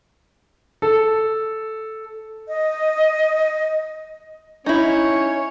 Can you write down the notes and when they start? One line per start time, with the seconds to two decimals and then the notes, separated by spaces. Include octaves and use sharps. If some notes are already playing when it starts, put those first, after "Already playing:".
0.82 A4
2.48 D#5
4.66 C#4 D#4 E4 C#5